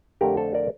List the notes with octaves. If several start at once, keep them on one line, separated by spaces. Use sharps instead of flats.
F2 D3 A3 D4 G4 A#4
A4 C5
A#4 D5